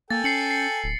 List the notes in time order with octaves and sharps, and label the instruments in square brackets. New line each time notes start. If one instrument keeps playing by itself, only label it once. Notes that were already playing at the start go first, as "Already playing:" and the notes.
[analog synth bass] A#3 [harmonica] A4 G5 G#5 [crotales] A6
[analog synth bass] C#4 [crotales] C7 C#7 F#7
[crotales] C7
[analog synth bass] D1